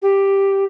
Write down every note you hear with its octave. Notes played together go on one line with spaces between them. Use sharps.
G4